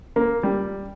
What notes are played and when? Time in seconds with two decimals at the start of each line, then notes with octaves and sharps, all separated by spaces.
0.16 A#3
0.43 G3